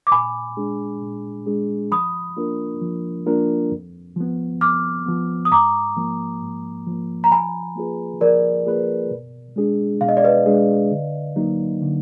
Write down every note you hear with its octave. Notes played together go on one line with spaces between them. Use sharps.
D6
A#2 G#5 B5
G#3 D4 G#4
A#2
G#3 D4 G#4
F3 B5 D#6
A#3 D4 F4 A#4
F3
A#3 D4 F4 A#4
F2
F3 B3
F2 D6 F6
F3 B3
D#6
G#2 A#5 D6
F3 A#3
G#2
F3 A#3
A#5
F3 G#5 B5
A#3 F4 G#4 B4
F3 A#4 D5
A#3 F4 G#4 B4
B2
G#3 D4 G#4
B2 F5
D#5
D5
B4 D#5
G#3 D4 G#4
D3
F#3 A#3 D#4
D3